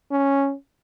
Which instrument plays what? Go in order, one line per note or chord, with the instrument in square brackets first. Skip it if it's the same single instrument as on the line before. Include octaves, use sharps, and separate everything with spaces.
[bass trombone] C#4